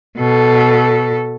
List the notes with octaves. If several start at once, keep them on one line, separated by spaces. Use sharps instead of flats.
B2 A4